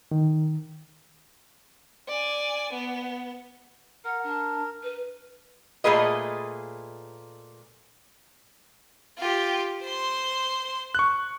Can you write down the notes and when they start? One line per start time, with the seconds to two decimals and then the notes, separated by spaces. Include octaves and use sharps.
0.11 D#3
2.08 D5 G#5
2.73 B3
4.05 A#4 F#5
4.23 D4
4.83 B4
5.84 A#2 A3 F4 G#4 B4 D#5
9.18 F4 G4
9.81 C5 C6
10.95 C#6 F#6